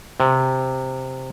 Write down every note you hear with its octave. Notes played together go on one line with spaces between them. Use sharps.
C3